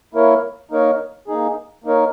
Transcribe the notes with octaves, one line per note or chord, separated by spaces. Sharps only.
A#3 E4 A#4 C#5
A#3 D#4 A#4 C#5
A#3 D#4 G#4
A#3 D#4 A#4 C#5